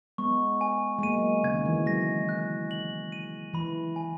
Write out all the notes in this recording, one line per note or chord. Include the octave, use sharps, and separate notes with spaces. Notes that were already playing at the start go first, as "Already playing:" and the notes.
G#3 B3 C#6
G#5
G#3
F#3 A#3 D#7
C#3 G#6
D#3
E3
F#3
G#3 A#6
F#6
F#7
D#7
E3 B5
G#5